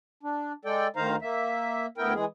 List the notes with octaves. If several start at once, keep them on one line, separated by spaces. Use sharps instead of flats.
D4
G#3 A4 D5 G5
D2 D#3 D#4 C5 F5 A#5
A#3 E5
D2 B3 E4 A#4 G5
E3 G#3 G#4